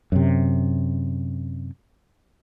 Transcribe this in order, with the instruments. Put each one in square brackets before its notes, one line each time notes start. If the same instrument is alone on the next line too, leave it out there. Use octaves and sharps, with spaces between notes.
[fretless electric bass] F#2 C3